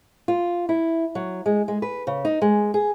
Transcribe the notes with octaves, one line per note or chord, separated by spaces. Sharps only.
F4
E4
F#3
G#3
G#3
B4
C#3
D#4
G#3
G#4